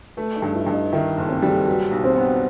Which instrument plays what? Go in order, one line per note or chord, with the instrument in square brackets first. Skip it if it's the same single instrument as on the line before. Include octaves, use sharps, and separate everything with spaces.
[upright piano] A3 [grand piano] B4
[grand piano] D#4 D#5
[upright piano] G2
[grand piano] E4 E5
[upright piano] G2
[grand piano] D#4 D#5
[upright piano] D#3 [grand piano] E4 E5
[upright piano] F#1
[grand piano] C4 C5
[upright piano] G3
[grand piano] A4
[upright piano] F#3 [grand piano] B4
[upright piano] B1
[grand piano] C4 C5
[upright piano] B3